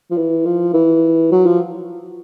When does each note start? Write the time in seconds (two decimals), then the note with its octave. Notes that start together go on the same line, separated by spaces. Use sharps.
0.10 F3
0.17 E3
0.45 F3
0.73 E3
1.32 F#3
1.46 F3